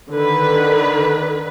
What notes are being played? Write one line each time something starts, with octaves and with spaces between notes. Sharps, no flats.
D3 D#3 B4